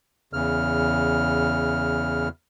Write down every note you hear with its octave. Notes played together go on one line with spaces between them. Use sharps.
E2 C#3 F6